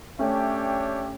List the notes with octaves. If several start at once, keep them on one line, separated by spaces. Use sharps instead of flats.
A3 C#4 D4 G4 C#5 E5 G5